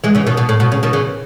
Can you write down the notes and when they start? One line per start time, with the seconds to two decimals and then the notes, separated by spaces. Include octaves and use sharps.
0.04 E3 G#3
0.15 C#3 E3
0.27 B2 D#3
0.37 B2
0.49 A2
0.60 B2
0.72 C#3
0.83 B2 D#3
0.93 C#3 E3